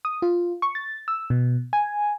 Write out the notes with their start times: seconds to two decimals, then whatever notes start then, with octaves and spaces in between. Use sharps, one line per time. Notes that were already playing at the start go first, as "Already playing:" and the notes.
0.05 D#6
0.22 F4
0.62 C#6
0.75 A6
1.08 E6
1.30 B2
1.73 G#5